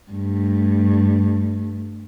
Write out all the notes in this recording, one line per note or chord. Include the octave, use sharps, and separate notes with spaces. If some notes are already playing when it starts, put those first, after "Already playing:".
G2 A3